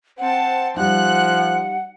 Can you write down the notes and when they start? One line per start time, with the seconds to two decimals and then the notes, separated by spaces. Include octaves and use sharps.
0.18 C4 F#5 A5
0.76 F3 G3 D#4 F#5 F#6